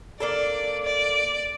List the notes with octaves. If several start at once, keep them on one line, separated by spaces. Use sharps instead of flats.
A#3 D4 A4 D5
D5